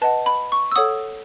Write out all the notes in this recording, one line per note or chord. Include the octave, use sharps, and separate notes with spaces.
B4 D#5 F#5 A5
B5
C#6
E6
A4 C#5 F#5 D#6